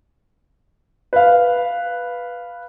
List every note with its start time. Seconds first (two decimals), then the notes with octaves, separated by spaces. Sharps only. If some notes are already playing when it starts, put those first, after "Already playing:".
1.13 B4 F5